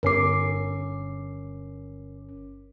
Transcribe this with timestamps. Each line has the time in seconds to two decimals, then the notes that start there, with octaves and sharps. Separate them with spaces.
0.03 G1 C#4 A#4 D6 C7